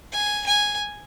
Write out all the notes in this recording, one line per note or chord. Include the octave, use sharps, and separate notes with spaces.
G#5
G#5